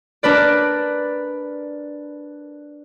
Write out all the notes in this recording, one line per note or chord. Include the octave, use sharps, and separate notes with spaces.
D4 A#4 B4 D5